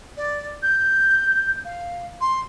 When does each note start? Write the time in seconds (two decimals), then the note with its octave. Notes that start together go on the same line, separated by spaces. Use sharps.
0.17 D5
0.63 G6
1.65 F5
2.21 C6